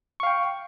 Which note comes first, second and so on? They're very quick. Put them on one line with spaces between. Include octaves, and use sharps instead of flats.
C#6 F5 G5